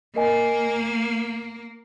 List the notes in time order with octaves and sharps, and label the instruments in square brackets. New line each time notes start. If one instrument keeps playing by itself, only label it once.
[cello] A#3 [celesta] A#4 D#5 G#5